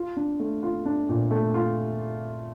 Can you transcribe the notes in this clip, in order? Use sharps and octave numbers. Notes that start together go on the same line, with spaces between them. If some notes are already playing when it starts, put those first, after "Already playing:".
Already playing: F4
D4
A3
F4
D4
A#2
A3
F4